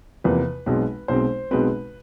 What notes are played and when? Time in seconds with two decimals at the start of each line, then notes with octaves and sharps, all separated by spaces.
0.24 E2 C3 F3 A#3 B4
0.66 B1 B2 G#3 C4
1.08 B1 B2 G#3 C4 C5
1.51 B1 B2 G#3 C4 B4